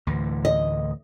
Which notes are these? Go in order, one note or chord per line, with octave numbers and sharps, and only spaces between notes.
D2 A2 E3
D#5